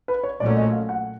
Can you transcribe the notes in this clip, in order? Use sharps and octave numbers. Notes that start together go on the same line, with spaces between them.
B4
C#5
A#2 F#3 A3 C#4 D5
D#5
F5
F#5